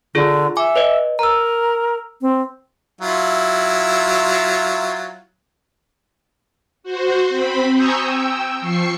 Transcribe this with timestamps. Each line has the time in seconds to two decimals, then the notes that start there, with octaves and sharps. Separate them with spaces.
0.15 D3 F4 G#4
0.57 E5 G#5 D6
0.76 B4 C#5 D#5
1.19 A#4 A#5 E6
2.22 C4
3.01 F#3 E4 F4
6.83 F#4 C5
7.29 C4 B5
7.74 G#5 A#5 C#6 D#6 E6 G6
8.04 G5 E6
8.61 F3 C#6 C7 C#7